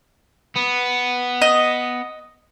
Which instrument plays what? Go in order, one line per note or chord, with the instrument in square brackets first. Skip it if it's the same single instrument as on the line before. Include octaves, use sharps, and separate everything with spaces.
[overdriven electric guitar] B3
[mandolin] D#5